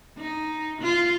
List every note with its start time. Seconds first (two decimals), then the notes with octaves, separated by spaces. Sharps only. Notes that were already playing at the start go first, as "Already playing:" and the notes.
0.18 D#4
0.82 F4